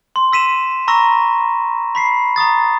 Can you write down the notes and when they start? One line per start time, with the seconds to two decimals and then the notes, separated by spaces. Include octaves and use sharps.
0.16 C6
0.33 E6 B6 D#7 E7
0.88 A#5 B5 C#6 E6 A#6
1.95 B5 B6 C7
2.36 A#5 C#6 D#6 A6